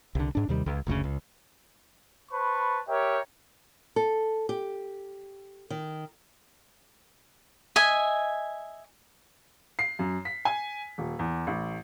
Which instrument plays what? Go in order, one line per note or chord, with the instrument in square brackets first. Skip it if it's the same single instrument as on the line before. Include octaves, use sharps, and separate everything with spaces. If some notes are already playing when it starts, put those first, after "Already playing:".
[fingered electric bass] C2 D3
G#2 D4
D#2 C3 D#3 G3
C#2
F#1 D2 A2 C#3
C#2
[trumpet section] B4 C5 A5 B5 C#6
G4 A#4 C#5 E5 G5
[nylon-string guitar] A4
G4
D#3
[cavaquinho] D#5 E5 G#5
[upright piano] C7
F#2
B6
G#5
D#1
E2
A1